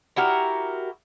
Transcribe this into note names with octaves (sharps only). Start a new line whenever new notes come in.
E4 F#4 G4 A#4